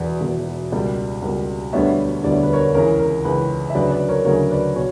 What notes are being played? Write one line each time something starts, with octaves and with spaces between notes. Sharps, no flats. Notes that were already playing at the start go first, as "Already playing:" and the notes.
Already playing: E1 E2 B2 B4 D5
E1 E2 B2
C#2 B2 G3 A#3
C#2 B2 G3 A#3
E1 D2 D3 G3 B3 C#5 E5
E1 D2 D3 G3 B3 D5
C#5
B4
A#4 C#5
C#2 C#3 E3 A#4 C#5
A#4
C#2 C#3 E3 B4
E5
D2 C#3 F#3 B4 D5
B4 D5
A#4 C#5
D2 C#3 F#3 A#4 C#5
B4 D5
B2 C#5